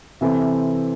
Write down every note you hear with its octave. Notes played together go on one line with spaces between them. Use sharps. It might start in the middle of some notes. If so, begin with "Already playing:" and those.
C3 E3 C4 A4